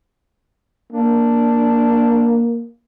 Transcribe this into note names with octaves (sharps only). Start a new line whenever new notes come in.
A#3 D4